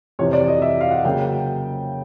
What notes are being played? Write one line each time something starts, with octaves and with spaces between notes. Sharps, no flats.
F2 C3 E3 C#5
D5
D#5
E5
F5
F#5
C#3 F#3 A#3 G5